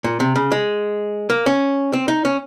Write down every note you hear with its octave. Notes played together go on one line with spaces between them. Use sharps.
A#2
C3
C#3
G#3
A#3
C#4
C4
D#4
C#4